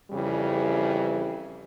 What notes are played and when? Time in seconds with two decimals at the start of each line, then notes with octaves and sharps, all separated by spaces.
0.11 F2 C#3 E3 G3